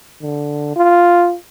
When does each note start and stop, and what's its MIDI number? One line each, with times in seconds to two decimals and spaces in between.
0.21 0.75 50
0.76 1.35 65